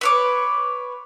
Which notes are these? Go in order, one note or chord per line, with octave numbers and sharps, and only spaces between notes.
B4 C#5 D6